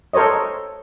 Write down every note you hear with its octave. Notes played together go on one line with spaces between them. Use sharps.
A4 A#4 C5 C#5 D#5